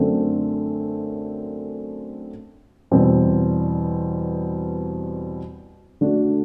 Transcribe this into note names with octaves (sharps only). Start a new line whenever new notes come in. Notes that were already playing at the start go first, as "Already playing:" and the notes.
Already playing: F#2 D3 A3 C4
E2 B2 G3 C4
D3 A3 D4 F#4